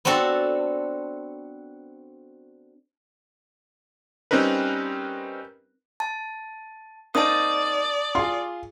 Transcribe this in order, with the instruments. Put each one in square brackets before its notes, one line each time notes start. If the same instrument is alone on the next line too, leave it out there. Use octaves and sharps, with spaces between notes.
[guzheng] B3 C4 D4 F#4 A4
[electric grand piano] G3 C4 C#4 D#4 A#4 B4
[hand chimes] A5
[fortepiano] A#3 C4 D#4 [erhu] D5 [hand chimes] A5 D#6
[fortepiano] F4 G#4 [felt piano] C6